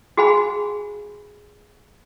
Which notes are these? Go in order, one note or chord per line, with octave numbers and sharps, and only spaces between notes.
F#4 G#4 F5 G#5 B5